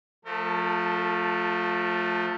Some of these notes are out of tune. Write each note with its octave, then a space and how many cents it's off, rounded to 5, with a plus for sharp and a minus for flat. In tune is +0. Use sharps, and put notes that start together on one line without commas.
F3 +20 A3 -5 A#4 -45